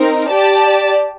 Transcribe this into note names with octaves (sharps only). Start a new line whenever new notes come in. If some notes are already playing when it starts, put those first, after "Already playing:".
Already playing: C4 D#4 A#4
G4 D5 A5